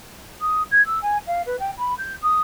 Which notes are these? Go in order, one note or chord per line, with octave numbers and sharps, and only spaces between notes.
D#6
G#6
E6
G#5
F5
B4
G5
B5
G6
D#6